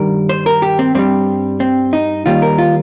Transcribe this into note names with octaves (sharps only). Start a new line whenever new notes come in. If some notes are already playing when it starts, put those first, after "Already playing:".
Already playing: G2 D#3 G3 A#4
C5
A#4
G4
C4
G2 G3 C4
C4
D#4
D#2 D#3 G3 F4
A#4
F4